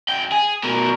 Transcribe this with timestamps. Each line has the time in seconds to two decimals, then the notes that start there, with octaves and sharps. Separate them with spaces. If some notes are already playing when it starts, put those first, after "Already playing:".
0.09 F#2 G5
0.32 G#4
0.63 B2 A#4